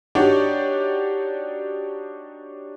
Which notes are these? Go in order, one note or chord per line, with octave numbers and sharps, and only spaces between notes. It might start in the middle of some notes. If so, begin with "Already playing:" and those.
D4 D#4 F#4 G4 C#5 D5